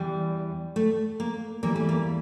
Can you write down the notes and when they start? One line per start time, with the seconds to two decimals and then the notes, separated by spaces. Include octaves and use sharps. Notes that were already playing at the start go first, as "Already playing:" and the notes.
Already playing: E2 E3 G3
0.76 A3
1.20 A#3
1.63 E2 E3 G3 A#3
1.76 A3
1.89 A#3